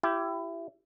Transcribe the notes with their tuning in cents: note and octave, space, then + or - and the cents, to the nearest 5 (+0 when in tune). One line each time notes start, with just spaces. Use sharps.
E4 +25 G4 -10